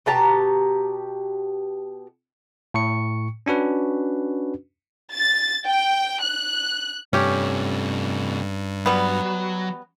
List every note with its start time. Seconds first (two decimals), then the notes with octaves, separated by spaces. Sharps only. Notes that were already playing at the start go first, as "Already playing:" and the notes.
0.06 B2 G4 A5 A#5
2.74 A2 C#6 C#7
3.46 C#4 D4 F#4 B4
5.14 A6
5.67 G5
6.23 F#6
7.13 G2 C3 A3 C#4 G4
8.86 F#3 G3 B3